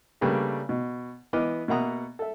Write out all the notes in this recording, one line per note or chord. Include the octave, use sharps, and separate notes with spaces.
C#3 G3 A3 A#3 D4 B4
B2
E3 B3 D#5 D6 F6
B2 A#3 E5 F#5 A#5 D#6
A4 E5